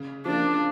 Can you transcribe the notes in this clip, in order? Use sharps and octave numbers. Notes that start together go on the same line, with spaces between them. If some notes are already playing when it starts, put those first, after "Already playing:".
Already playing: C#3
F3 A#3 D4